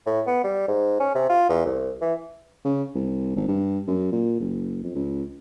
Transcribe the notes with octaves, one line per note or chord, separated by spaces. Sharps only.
A2
B3
G3
G#2
C#4
C3
F4
E2
C2
E3
C#3
C2
G#1
G2
F#2
A#2
F#1
F2
C#2